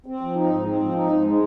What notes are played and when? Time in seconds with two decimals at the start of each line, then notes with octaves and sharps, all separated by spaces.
0.06 C4
0.21 F3
0.36 D#4
0.50 G#2
0.65 C4
0.80 F3
0.94 D#4
1.10 G#2
1.25 G#3